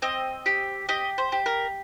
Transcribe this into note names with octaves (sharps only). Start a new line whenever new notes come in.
C4 D#5
G4
G4 D#5
C5
G4
A#4